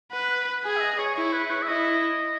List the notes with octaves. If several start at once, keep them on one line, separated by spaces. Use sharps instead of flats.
B4 F#5
G#4 G#5
E5
D#5
C#5
E4 C#5
B4
C#5
E5
E4 D#5